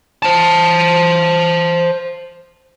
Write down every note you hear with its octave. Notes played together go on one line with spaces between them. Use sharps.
C5 A5